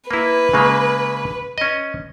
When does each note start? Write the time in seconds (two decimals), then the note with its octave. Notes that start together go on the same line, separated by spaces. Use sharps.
0.11 A#3 E4 B4
0.53 C#3 G#3 A#3
1.58 C#4 D#5